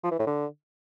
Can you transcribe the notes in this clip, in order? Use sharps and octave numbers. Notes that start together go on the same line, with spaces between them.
F3
E3
A2
D3